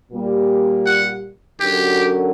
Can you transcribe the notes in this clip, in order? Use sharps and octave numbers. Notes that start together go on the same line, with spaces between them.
A#2 G3 A#3
F#5
D3 F#3 C#4 F#4 G4 A#4